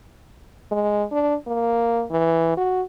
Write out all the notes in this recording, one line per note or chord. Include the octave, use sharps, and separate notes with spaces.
G#3
D4
A#3
E3
F#4